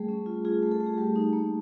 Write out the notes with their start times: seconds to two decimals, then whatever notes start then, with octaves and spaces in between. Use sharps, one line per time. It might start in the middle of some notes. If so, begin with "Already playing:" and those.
Already playing: G3 A3 G#4
0.09 C#4
0.26 F4
0.45 F4 G#4
0.63 A3
0.72 A4
0.81 A3
0.86 G#4
0.98 G3 G4
1.16 D#4
1.33 A#3